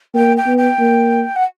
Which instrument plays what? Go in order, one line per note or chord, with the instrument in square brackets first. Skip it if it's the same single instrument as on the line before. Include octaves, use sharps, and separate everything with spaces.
[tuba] A#3 [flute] G5
[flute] G5
[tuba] B3
[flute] G5
[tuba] A#3
[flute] F#5